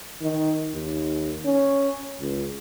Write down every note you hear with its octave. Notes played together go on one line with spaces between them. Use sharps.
D#3
D#2
C#4
C#2